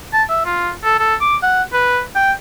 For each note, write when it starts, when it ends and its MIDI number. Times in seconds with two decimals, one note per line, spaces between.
0.13 0.23 81
0.30 0.42 76
0.45 0.71 65
0.84 0.99 69
0.99 1.15 69
1.21 1.36 86
1.42 1.63 78
1.73 2.00 71
2.16 2.32 79